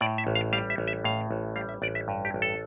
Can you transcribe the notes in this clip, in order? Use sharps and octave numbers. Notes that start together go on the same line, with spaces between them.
A2 D5
E5
A1
F5
G3 F5
E5
A1
E5
A2 F5
A1
G3 F5
E5
A1 D5
E5
G2
G4
A1
A4